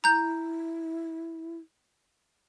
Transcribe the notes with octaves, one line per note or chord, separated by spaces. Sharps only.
E4 A#5 G6